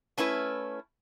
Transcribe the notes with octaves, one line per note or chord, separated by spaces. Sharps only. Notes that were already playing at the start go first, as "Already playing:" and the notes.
A3 C#4 E4 B4